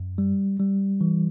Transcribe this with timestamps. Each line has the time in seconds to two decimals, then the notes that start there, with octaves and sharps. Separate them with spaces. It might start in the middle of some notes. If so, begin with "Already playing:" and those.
Already playing: F#2
0.18 G3
0.60 G3
1.01 E3